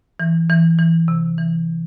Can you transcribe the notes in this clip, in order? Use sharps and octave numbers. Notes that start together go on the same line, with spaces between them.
E3
E3
E3
C3
E3